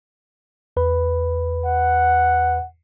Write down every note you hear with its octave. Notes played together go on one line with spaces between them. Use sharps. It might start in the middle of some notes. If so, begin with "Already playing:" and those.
E2 B4 B5
F#5